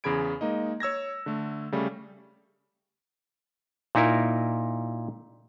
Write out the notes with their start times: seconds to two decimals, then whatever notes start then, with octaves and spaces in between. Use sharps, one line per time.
0.04 E2 C#3 G#4 B5 G#6 D7
0.41 G#3 A#3 D#4 D#5
0.80 C#5 E6 G#6 A#6
1.26 D3 A3
1.72 C#3 G3 A3
3.95 A#2 D#4 E4 A#4